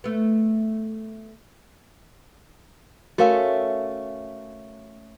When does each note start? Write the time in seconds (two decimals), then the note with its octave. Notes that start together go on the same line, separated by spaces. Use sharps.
0.04 A3 B3
3.18 A3 C#4 F#4 A#4 E5 F5